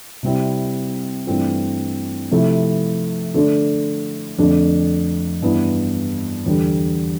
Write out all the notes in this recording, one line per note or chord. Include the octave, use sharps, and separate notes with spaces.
C3 G3 C4 E4
G2 E3 A3 C4 F4
C3 F3 A3 E4
D3 A3 D4
F2 D3 A3 D4
G2 E3 B3 E4
E2 D3 G3